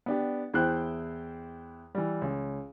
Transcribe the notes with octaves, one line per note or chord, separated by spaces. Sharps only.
B3 D4 G4
E2 E4 C5 G5 F#6
E3 G3
C#2